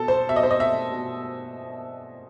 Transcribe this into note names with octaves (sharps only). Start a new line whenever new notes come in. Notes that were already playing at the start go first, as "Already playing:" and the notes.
Already playing: B2 A4
C5
B2 E5
D#5
C5
D#5
E5
B2